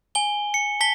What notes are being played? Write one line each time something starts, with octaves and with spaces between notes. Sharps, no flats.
G#5 G7
C#7
A5 B6 G7